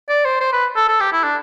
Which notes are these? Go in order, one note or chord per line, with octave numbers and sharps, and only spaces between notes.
D5
C5
C5
B4
A4
A4
G4
E4
D4